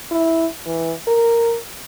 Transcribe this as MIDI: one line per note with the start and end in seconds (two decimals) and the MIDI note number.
0.11 0.46 64
0.66 0.93 52
1.07 1.58 70